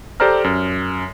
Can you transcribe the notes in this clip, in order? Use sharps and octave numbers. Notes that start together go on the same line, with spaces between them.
G4 A4 C5 D5 A#5 F6
F#2